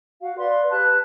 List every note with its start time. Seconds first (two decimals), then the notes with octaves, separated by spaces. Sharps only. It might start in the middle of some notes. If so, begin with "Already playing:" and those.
0.20 F#4 F5
0.38 B4 D5 F5 C6
0.70 G4 B4 A5 F#6